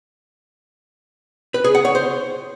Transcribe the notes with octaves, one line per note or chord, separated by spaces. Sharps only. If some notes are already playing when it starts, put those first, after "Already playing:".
B4
G#4
F#5
C#5
C5